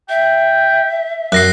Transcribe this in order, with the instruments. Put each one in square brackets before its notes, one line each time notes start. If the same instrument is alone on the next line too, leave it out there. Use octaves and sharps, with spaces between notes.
[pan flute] E5 [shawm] G5
[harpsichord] F#2 [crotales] F#6 A#6 C7